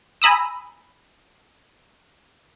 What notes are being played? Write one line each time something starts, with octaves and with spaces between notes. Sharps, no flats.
G#5 A#5 B5 D#6 E6